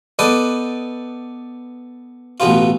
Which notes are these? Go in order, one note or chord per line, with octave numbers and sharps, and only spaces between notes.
B3 A4 B4 D5 D#5 G5
A1 B2 B3 F4